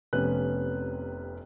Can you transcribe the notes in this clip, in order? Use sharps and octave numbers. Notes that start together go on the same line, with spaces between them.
F1 C3 B3 C#4 B4 F#6